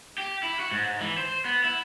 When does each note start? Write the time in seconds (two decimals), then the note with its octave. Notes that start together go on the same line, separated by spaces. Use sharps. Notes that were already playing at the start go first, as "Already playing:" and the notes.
0.18 G4
0.43 E4
0.59 F#4
0.72 G#2
1.01 E3
1.18 C5
1.45 B3
1.64 E4